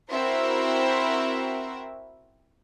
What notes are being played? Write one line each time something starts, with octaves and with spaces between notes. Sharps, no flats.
C4 E4 F#4 A#4 C5 E5